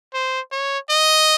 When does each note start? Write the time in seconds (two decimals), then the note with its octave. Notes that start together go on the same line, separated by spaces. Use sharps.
0.14 C5
0.52 C#5
0.89 D#5